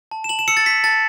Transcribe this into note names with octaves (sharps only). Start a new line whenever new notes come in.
A5
E7
A5 F#7
E7
E6 C#7
A6
E6 B6
A5 A6